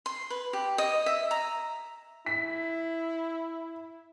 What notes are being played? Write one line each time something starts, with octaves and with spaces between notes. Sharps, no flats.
C6
B4
G4
D#5
E5
A#5
E4 B6